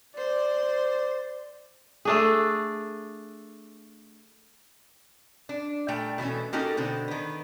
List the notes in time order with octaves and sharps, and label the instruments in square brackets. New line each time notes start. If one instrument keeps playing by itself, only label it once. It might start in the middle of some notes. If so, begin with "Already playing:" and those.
[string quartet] C5 [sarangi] D5
[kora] A3 D4 G#4
[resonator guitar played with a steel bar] D4
A#2 G3 A3 G5
B2 E3 A3 C#4
A#3 C#4 D#4 F#4 G4 A4
B2 D3 C4
D#3 B3